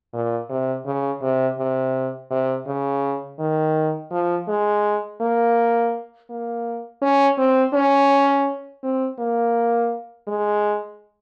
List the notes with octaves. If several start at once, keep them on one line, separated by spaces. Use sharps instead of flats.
A#2
C3
C#3
C3
C3
C3
C#3
D#3
F3
G#3
A#3
A#3
C#4
C4
C#4
C4
A#3
G#3